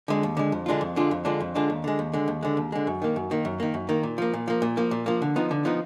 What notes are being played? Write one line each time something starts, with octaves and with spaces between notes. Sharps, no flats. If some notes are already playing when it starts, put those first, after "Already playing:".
D3 G#3
D#2
D3 G#3
F2
D3 G#3 D4 F4
F2
D3 G#3 D4 F4
F2
D3 G#3 D4 F4
F2
D3 G#3 D4 F4
D#2
D3 G#3
D#2
D3 G#3
D#2
D3 G#3
D#2
D3 G#3
F#2
D#3 A#3
F#2
D#3 A#3
F#2
D#3 A#3
F#2
D#3 A#3
A#2
F3 A#3
A#2
F3 A#3
A#2
F3 A#3
A#2
F3 A#3
D3
F3 B3 D#4
D3
F3 B3 D#4